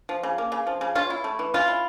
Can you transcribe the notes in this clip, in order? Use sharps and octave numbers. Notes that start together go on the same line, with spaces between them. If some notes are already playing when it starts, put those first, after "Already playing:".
F3
C#3
A#3
C#3
F3
C#3
C#4 F4
E4
A3
E3
C#4 F4
E4